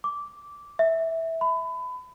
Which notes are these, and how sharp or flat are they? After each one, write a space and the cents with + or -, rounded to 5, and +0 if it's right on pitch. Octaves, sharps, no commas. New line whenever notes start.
D6 -10
E5 -10
B5 +30